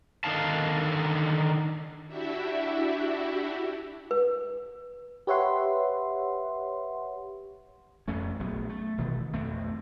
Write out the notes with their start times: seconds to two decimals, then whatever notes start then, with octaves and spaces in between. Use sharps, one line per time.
0.24 D3 D#3 D#4 F5 A5
2.08 D4 E4 F#4 G4 E5
4.11 B4
5.27 G4 B4 C#5 E5 F#5 C6
8.08 A1 F2 A3 C#4
8.40 A#1 F#3 A3 B3
8.69 A3
8.98 F1 B2 D#3 E3
9.33 B1 F2 A3 C4